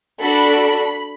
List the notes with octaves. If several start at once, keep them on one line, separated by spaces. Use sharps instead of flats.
D4 F#4 A4 B5